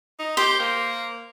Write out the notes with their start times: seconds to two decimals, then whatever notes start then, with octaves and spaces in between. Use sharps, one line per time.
0.19 D#4
0.37 G4 C5
0.59 A#3